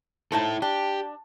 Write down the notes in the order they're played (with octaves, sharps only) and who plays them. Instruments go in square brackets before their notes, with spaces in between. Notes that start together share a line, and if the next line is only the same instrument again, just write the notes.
[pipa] F3 D#4 A5 [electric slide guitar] E4 A4
[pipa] D4 [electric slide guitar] G4